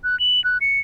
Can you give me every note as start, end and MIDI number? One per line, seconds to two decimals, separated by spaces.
0.04 0.18 90
0.20 0.43 102
0.44 0.58 90
0.61 0.80 97